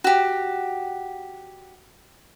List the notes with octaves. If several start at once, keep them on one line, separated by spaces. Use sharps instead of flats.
F#4 G4